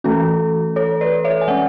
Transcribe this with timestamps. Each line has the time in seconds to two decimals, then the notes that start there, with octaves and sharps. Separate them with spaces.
0.04 E3 A3 C#4 F#4 A4
0.76 A4 C#5
1.01 B4 D5
1.24 C#5 E5
1.41 G#5
1.48 G#3 C#4 D5 F#5